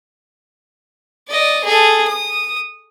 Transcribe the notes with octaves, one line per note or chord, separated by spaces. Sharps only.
D5 D#5
G#4 A4
D#6